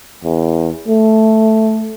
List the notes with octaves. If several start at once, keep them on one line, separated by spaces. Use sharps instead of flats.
E2
A3